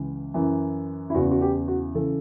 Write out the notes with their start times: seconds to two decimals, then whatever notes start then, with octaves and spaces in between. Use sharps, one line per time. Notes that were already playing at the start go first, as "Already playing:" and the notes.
Already playing: C#2 C#3 E3
0.34 F#2 E3
1.10 E4
1.14 E2 C#3 E3 F#4
1.31 F#4
1.42 G4
1.68 F#4
1.95 C#3 E3 A4